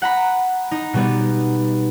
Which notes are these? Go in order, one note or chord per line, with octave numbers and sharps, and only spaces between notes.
F#5 A#5 B5
D#4
B2 G3 B3